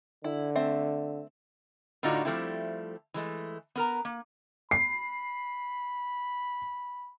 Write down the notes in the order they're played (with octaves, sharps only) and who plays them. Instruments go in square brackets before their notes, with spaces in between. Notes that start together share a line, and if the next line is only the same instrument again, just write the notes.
[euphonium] D3 [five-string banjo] E4
[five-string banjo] A3 C4 E5
[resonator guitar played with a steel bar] A2 D3 D4 D#4 F4 F#4
F3 G3 A3 C4 E4
E3 G#3 A3
B3 A#4 A#5
A#3
[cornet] B5 [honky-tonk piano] C7